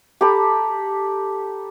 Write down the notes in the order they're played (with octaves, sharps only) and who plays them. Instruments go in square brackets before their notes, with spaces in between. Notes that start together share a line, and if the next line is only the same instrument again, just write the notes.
[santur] G4 A4 A#5 B5